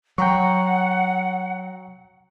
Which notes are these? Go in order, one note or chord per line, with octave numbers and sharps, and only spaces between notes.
F#3 F#5 G5 A#5 C#6